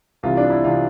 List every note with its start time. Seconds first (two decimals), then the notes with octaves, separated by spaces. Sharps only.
0.23 C2 C3 E3 F4
0.37 D4
0.50 E4
0.64 C3 E3 F4